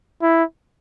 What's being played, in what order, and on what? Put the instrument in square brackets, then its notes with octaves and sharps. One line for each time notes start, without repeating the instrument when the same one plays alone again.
[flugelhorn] E4